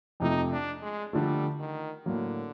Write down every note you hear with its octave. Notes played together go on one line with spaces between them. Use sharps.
F2 C3 F3 A3 D#4
D4
G#3
D3 F3 G3 A3
D#3
A2 D3 F#3 A#3